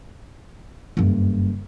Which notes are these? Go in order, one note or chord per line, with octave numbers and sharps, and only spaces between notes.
F#1 G2